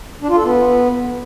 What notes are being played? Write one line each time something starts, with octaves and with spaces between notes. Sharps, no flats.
D4
F4
A4
B3